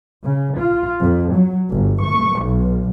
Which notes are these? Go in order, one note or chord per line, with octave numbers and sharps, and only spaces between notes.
C#3
F4
F2
F#3
G1
C#6
B1